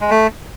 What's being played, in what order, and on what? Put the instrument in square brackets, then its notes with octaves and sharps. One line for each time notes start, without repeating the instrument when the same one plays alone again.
[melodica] G#3
A3